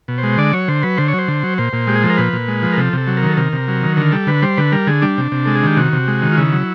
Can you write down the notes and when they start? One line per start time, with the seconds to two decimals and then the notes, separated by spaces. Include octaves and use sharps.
0.08 B2
0.18 C5
0.23 G#3
0.38 D3 D5
0.53 F#3 C#5
0.68 D3 C5
0.83 F#3 B4
0.97 D3 C5
1.08 C#5
1.14 F#3 C5
1.28 D3
1.43 F#3
1.58 A#2 C5
1.73 A#2
1.87 G#3 G4
1.95 G#4
2.03 F3 A4
2.10 A#4
2.17 A#2 B4
2.33 A#2
2.48 G#3
2.63 F3
2.73 A#4
2.78 C3 A4
2.93 C3 A4
3.07 F#3
3.17 A#4
3.23 D#3
3.29 A4
3.37 C3 A#4
3.53 C3
3.68 F#3
3.83 D#3
3.97 D3 A#4
4.12 G3 A4
4.27 D3 B4
4.42 G3 C5
4.58 D3 B4
4.72 G3 A#4
4.87 D3 G#4
5.02 G3 D4
5.18 C3
5.32 C3
5.45 G#3 A4
5.55 G#4
5.63 D#3 G4
5.77 C3 F#4
5.93 C3
6.08 G#3
6.22 D#3
6.32 F4
6.38 C#3 E4
6.52 F#3